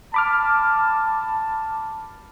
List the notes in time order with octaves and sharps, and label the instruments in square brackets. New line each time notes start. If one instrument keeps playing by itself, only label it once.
[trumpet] A5 [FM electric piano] B5 D6 F6